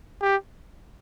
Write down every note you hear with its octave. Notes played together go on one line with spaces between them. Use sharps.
G4